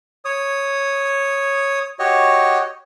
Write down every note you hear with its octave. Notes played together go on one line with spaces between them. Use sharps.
C#5 D#6
F#4 G4 C#5 D#5